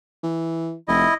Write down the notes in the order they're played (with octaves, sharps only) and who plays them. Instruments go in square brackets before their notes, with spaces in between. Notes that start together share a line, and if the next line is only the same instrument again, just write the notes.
[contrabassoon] E3
[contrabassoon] F1 [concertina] E4 D#5